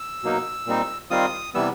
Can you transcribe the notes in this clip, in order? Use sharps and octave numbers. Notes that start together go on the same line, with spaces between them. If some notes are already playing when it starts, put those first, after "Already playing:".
Already playing: E6
B2 F#3 A#3 D#4
A#2 G3 C4 D#4
D#3 G3 C4 F4 D#6
C3 E3 G3 B3 E6